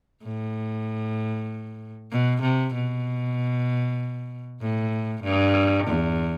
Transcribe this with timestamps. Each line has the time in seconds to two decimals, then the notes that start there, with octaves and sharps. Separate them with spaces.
0.24 A2
2.12 B2
2.42 C3
2.74 B2
4.62 A2
5.24 G2
5.87 E2